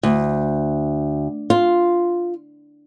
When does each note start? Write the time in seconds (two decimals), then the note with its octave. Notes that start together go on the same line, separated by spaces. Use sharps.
0.03 D2
1.50 F4